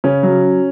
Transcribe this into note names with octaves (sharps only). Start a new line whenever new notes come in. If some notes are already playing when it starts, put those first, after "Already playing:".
C#3 C#4
F#3